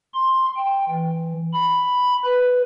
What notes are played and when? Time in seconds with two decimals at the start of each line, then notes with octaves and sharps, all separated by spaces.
0.14 C6
0.57 G5
0.89 E3
1.54 B5
2.25 B4